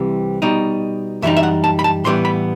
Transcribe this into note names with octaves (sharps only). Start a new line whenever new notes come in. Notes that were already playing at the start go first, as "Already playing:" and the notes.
Already playing: C2 C3 E3 G3 C4
B2 G3 D#4
F#2 E3 G3 D#4 E5
E5
F#5
A5
B5
A5
A2 E3 G3 B3 C6
B5